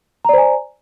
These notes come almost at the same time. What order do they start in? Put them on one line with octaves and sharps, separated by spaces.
A#5 D5 C5 G#5